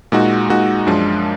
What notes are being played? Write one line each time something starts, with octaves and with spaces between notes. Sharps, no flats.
A#2 G#3 D#4 F#4
A#2 G#3 D#4 F#4
F#2 F3 G#3 D4 F4